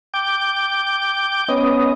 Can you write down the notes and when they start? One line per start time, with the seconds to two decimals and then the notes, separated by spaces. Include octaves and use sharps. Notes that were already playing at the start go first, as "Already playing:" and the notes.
0.14 G5 D6 G6
1.49 B3 C#4 D#5